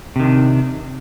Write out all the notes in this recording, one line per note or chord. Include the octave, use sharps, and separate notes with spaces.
C3 D#3 D4